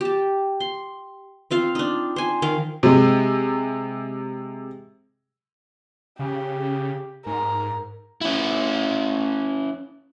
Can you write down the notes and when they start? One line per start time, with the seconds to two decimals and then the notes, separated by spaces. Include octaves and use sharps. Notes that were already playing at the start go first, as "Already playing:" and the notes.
0.01 G4 A5
0.60 C6
1.51 C4 F4 F5
1.75 D4 D#4
2.16 C5 G#5
2.42 D#3 A#4 F5
2.83 C3 G#3
6.19 C#3 G4
7.26 G#2 A#4
8.21 C#4 E4